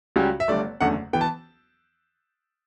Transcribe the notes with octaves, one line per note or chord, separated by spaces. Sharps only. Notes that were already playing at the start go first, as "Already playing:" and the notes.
C#2 C#3 G3 C#4 F#4 G4
E5
G1 G2 D3 A3 D5
F#1 E2 D3 A3 C#4 F#5
E3 B3 G5
A5